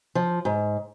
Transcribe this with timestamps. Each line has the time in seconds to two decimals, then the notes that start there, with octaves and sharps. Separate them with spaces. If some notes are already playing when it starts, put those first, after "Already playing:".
0.15 F3
0.45 G#2